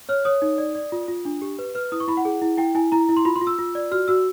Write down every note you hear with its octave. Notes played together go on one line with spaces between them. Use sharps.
C#5 F6
C#5 D#6
D#4
D5
D5
F4
F4
D4
G4
B4
B4 F6
E4 D#6
C#6
E4 B5
F#5
G#4
E4
E4 G5
E4 G#5
E4 A#5
E4
C6
F4 B5
C6
F4
E6
F4
D5
F#4 F6
F#4 E6